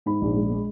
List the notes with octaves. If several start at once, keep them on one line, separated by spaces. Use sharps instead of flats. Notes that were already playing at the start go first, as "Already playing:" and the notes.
G#2 B5
A#1
G#3
G#3